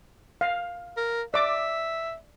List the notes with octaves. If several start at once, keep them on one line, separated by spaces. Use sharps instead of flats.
F5
A#4
D5 E5 D6